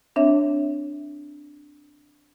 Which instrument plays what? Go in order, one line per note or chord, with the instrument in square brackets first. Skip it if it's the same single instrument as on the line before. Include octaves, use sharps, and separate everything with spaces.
[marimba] C4 D4 C#5 E5